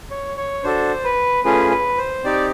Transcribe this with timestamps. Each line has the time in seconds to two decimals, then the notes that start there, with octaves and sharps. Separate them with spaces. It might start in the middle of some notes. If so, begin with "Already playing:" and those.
0.11 C#5
0.37 C#5
0.64 D4 F#4 A4 C5
1.04 B4
1.44 A3 C#4 F4 G#4 B4
1.71 B4
1.98 C5
2.24 C4 D#4 G4 D5